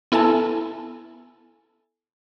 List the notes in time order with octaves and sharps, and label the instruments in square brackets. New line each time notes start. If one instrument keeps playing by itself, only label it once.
[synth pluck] B3 E4 A4 G#5 A5